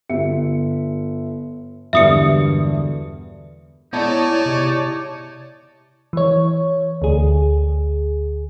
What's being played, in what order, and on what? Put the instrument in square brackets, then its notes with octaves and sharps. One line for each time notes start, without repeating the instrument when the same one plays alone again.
[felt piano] G1 E5 C#7
[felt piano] E1 G2 D3 [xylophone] E5 D#6 C#7
[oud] G#3 E4 [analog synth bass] B3 [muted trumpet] D#4 [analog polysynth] C#5 D5 A5
[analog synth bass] C3
[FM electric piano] E3 C#5
D2 G#4